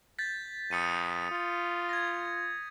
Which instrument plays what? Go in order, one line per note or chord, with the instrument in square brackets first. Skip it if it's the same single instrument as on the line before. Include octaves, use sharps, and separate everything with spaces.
[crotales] G6 A6 B6
[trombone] F2 [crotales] D#6 C#7 D#7
[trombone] F4
[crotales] G#6 A#6